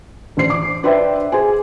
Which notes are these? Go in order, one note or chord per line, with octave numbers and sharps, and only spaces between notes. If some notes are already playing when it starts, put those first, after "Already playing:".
A1 D4 C5 C7
D6
D4 B4 C5 E5 G5
G#4 C5 G#5